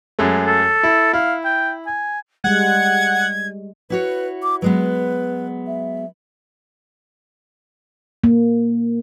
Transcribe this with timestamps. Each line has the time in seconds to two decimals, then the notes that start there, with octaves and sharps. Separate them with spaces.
0.19 F#2 G#3 A3
0.47 A4
0.83 E4
1.13 E4 F5
1.45 G5
1.87 G#5
2.44 G3 G#3 F#5 G#6
3.90 E4 F#4 B4 C#5
4.43 D6
4.62 F#3 G#3 B3 B4
5.67 E5
8.24 A#3